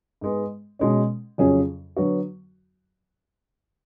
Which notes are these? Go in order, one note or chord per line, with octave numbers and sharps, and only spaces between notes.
G#2 G#3 B3
B2 G#3 C#4
F2 C#3 F#3 C#4 G#4
D3 F#3 B3 F#4